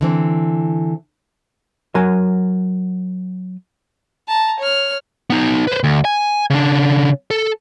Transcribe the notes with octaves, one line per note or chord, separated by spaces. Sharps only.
D3 E3 C4
F#3 A#4 G#5
A5 A#5
C#5 F6
B3 D#4
B4 C5
D2
G#5
C#3 D4
A4